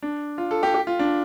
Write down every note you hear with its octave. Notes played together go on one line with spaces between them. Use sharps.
D4
F4
A4
G4
G4
F4
D4